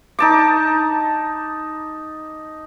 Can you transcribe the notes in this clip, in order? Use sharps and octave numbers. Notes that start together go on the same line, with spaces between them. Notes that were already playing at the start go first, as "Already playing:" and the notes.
D#4 A5 D6